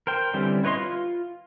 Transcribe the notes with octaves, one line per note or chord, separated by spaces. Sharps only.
A#4 C5 G5
D3 E3 G3 C4 C#4
E4 B4 C#5 D#5 C6
F4